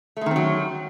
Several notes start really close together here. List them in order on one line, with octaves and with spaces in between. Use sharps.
A3 G#3 D#3 C4 F#3